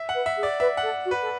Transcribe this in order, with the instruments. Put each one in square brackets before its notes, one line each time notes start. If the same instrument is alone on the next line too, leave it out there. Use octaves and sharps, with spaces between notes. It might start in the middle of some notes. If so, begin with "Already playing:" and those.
Already playing: [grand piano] E5
F#5
[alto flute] B4
[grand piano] E5
[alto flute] G#4
[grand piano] D5
[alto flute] B4 [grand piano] E5
[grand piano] F#5
[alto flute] A4
F#4
[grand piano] B4
[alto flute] A4